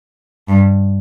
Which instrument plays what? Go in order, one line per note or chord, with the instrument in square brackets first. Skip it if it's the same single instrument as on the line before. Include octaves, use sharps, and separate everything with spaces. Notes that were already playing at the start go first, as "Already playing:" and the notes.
[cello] G2